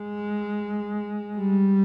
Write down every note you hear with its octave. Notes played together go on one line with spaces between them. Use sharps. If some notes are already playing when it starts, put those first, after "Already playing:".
Already playing: G#3
G3